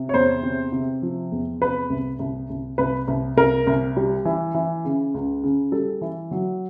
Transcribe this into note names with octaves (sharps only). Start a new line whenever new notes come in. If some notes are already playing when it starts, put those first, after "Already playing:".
Already playing: C3
C#5
E2 C5
C3
C3
F3
E2
C3 B4
C2
C2
C2
C2 B4
C2
C2 A#4
C2
G3
E3
E3
C#3
C#2
C#3
G3 A4
E3
F#3